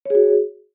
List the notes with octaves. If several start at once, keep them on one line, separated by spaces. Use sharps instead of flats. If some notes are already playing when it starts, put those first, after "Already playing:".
F#4 G#4 C#5